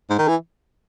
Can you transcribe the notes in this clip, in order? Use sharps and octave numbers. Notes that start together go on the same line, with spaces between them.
G#2
D#3
E3